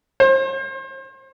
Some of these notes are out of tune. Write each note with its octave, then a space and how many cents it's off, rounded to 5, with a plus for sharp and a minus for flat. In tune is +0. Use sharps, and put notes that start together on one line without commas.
C5 +35